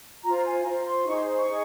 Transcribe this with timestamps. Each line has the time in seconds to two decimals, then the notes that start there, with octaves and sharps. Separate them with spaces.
0.23 F4 C5 A#5
0.43 G#5
0.64 F4 C5 A#5
0.85 C6
1.06 D#4 G#4 C5 C#6
1.16 C6
1.26 C6
1.36 C#6
1.46 D#4 G#4